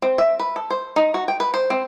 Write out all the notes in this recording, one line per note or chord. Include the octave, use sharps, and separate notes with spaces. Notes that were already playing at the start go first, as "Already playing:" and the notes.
C4
E5
B4
A4
C5
D#4
F#4
G5
B4
C5
C4